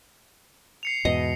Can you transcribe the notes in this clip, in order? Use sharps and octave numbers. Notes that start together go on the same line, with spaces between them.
C7 C#7 F7
E2 G#2 B2 D#5